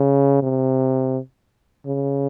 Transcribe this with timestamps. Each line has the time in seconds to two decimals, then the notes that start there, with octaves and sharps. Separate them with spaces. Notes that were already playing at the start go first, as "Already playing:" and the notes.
Already playing: C#3
0.43 C3
1.86 C#3